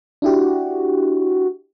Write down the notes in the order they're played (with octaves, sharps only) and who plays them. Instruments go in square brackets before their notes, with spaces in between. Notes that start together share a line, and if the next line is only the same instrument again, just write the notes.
[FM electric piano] D4 E4 G4 [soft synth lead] F#4